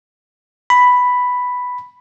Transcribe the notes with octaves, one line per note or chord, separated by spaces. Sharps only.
B5